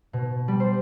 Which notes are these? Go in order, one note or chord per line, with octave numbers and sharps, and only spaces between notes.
B2
G3
C5